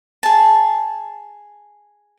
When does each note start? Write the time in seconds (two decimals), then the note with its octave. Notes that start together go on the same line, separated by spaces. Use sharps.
0.23 G#4 A5